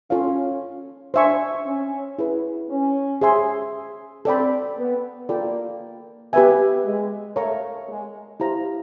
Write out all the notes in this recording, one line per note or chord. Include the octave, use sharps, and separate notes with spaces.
C#4 F4 A4 C#5 F5
D4 C5 E5 G#5 C#6
C#4
E4 G#4 B4
C#4
G#4 C5 E5 G#5 C6
C4 A4 D5 G5 B5
B3
A#3 F4 A4 D5 G5 B5
B3 G4 B4 E5 G#5
G#3
A3 A#4 C#5 F5 A#5 C#6
G#3
E4 G4 C5 F5 A#5